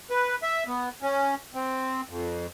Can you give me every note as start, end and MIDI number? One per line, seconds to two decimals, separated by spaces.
0.10 0.35 71
0.43 0.63 76
0.67 0.89 59
1.02 1.35 61
1.54 2.01 60
2.09 2.46 41